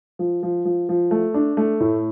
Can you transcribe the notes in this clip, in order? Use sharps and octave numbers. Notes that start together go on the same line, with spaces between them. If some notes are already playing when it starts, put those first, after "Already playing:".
F3
F3
F3
F3
A3
D4
A3
A2